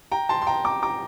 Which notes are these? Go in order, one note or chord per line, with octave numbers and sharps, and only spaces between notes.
G5 A#5
A5 C6
C6
G5 A#5
A#5 D6
A#5 D6